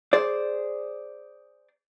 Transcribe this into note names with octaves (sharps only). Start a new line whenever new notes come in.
G#4 C5 D5